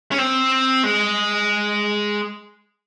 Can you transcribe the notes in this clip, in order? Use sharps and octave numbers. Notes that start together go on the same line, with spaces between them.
C#4
C4
G#3